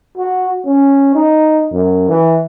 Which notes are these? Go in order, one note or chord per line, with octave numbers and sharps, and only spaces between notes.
F#4
C#4
D#4
F#2
E3